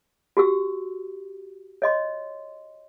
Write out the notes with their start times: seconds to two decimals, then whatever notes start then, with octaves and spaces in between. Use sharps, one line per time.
0.37 F#4 G4 E6
1.82 C#5 D#5 C6